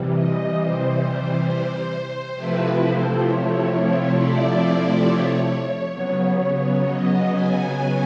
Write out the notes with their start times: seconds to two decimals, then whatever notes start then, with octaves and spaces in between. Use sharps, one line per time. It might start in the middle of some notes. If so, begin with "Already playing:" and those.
Already playing: C3 E3 G3
0.11 D#5
0.55 C5
1.45 C5
2.34 C3 F3 A3 C4 E4 B4
2.80 C5
3.24 C#5
3.68 C#5
4.13 D5
5.03 C#5
5.92 C#3 F#3 B3
6.81 D#5
7.26 G#5
7.71 G#5